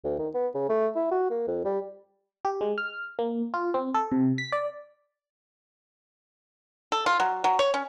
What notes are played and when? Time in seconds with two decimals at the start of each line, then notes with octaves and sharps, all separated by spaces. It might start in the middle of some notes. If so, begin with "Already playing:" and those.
0.04 D2
0.19 D#3
0.34 B3
0.54 C#3
0.69 A3
0.96 E4
1.11 F#4
1.30 A#3
1.47 F2
1.65 G3
2.45 G4
2.61 G#3
2.78 F6
3.19 A#3
3.54 F4
3.74 C4
3.94 A4
4.12 C3
4.38 B6
4.52 D5
6.92 A4
7.06 F4
7.20 F#3
7.44 F#3
7.59 C#5
7.74 C#4